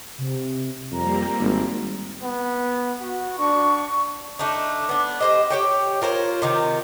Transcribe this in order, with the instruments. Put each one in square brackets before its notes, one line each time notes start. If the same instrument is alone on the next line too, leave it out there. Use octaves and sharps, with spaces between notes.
[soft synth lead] C3
[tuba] F2 [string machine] G3 A#3 C4 [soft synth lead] A#5
[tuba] G#1
[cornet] B3
F#4
[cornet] D4 [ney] C#6
[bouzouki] A3 D4 D#4
B3 D4
G4 C5 D#5
G4 C#5 G5
F4 A#4 C5 C#5
C3 D#3 F4